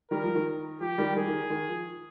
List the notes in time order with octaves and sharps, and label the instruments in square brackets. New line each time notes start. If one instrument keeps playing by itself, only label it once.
[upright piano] D#3 G3 [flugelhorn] A#4
[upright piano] F3
D#3
[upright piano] F3 [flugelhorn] G4
[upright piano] D#3 G3
[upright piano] D#3 [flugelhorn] G#4
[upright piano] D#3
D#3
F3